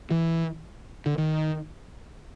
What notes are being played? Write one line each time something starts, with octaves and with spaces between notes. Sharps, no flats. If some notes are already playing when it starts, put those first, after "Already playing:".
E3
D3
D#3